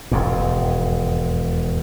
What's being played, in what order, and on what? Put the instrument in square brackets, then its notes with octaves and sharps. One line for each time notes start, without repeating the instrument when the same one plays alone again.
[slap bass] E1 F2 G#2